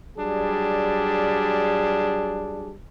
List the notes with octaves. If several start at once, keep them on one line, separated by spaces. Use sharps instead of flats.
F#3 G3 D4 G#4